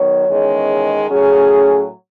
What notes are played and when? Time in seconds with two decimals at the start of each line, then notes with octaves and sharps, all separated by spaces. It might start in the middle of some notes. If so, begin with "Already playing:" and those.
Already playing: D#3 F#3 B3 C#5
0.28 E2 D#3 G#3 C#4
1.08 A2 F#3 C#4 G#4